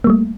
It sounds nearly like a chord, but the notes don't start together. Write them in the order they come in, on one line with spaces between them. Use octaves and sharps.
A#3 G3 A3